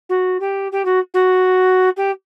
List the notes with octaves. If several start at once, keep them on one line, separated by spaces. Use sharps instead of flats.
F#4
G4
G4
F#4
F#4
G4